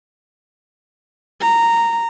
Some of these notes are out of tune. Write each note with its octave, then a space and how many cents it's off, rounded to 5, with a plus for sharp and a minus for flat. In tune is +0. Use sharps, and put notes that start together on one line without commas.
A#5 -10